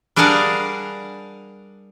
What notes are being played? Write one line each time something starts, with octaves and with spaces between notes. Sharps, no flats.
G3 D4 G#4 A#4 F5 F#5